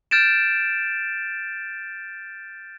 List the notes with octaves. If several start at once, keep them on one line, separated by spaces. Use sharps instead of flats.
F6 G6 A6 D7 E7